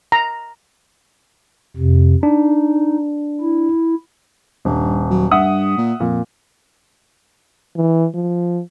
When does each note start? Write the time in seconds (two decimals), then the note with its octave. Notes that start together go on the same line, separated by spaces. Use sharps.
0.12 A#5
1.77 F2 C3
2.23 D4 D#4
3.41 E4
4.65 D#1 G2
5.10 F#3
5.31 G2 E5 F#5 D#6
5.77 A#2
6.00 F2 A#2
7.76 E3
8.15 F3